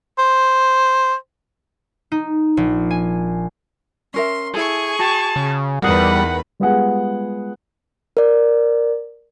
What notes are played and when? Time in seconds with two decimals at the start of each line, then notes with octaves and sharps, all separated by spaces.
0.18 C5
2.12 D#4
2.57 A#1
2.90 G#5
4.14 C#4 A#4 E5 C6
4.54 E4 G#4 A4 G#5 C#6
4.99 F#4 G5 A5
5.36 C#3
5.82 E2 D#3 G3 G#4 A#4 B4 F#5
6.60 G3 G#3 B3 F4 G#4 F#5
8.17 A#4 D5